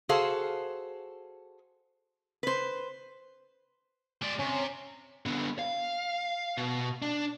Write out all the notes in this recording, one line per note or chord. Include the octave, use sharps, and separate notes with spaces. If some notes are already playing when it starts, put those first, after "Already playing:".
F#4 G#4 A4 C5 F5
B4 C5
G#3 D5
C3 C#4
D3 B3
F5
B2
D4